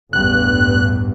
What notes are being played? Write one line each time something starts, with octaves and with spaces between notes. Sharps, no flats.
A1 E2 G2 F#6